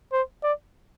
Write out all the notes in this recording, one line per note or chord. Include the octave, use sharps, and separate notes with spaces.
C5
D5